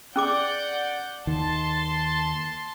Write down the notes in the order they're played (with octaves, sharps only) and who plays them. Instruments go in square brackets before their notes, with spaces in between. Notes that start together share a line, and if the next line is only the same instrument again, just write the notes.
[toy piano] C#4 G#4 D6 [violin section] D5 F#5 G6
[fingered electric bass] D#2 D#3 [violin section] A5 C6